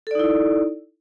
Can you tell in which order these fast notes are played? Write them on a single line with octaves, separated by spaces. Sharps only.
A4 D5 D#4 E4